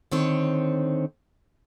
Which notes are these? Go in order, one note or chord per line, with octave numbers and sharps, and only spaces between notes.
D3 D#3 C4 C#5